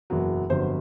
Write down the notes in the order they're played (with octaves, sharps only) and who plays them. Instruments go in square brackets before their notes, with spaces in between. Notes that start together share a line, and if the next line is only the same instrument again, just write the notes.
[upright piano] F#1 E2 B2 F#3
G1 F2 D3 F#3 C5